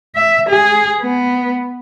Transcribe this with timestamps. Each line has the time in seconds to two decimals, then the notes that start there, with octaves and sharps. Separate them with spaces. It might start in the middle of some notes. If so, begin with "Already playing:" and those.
0.16 E5
0.50 G#4
1.01 B3